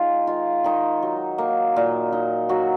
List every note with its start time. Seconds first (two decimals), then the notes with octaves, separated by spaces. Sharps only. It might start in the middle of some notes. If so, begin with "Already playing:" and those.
Already playing: G#3 D#4 F4
0.27 D#3 F4
0.64 D#3 D#4
1.02 F#3
1.38 A#3
1.76 A#2
2.12 D#4
2.49 F#3 F#4